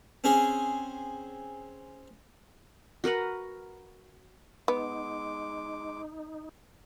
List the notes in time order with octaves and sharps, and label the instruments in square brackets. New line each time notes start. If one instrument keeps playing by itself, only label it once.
[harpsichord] C4 C#4 G#4
[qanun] F#4 A#4 B4 F#5
[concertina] G#3 D6 [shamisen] B3 [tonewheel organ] D#4